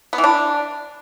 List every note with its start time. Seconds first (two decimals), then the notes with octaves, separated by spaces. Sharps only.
0.13 B3
0.18 E3
0.24 D4